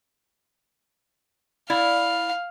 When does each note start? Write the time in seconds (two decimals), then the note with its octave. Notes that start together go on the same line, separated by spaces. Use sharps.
1.70 E4 D5 F5